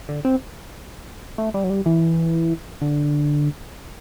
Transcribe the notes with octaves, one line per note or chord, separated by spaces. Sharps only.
D3
C4
A3
G3
F#3
G3
E3
D3